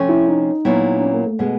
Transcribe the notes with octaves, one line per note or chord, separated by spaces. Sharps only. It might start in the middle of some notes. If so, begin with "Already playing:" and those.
Already playing: C3 F3 A3 C#4
E4
D#4
A#2 F#3 B3 E4
D4
C#4
A#3
A3
B2 G#3